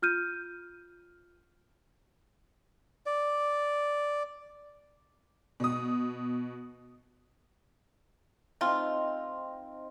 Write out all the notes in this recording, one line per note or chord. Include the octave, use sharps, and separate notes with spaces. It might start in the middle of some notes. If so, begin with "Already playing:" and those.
F4 F6 G6 D#7
D5
B2 D#6
A3 C4 D#4 F4